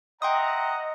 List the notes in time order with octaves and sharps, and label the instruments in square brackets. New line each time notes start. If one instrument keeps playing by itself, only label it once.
[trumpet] D#5 [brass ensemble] E5 F#5 A#5 [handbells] G5 C6 D#6